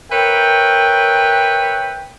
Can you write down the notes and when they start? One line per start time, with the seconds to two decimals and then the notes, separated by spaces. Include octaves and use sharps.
0.11 A#4 B4 C#5 E5 G5